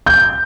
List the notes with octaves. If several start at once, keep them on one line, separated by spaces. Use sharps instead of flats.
G6